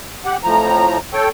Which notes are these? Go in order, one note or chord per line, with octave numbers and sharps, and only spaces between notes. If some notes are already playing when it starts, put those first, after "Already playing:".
G4 F#5
F2 A2 F3 A#5
A4 C#5 G5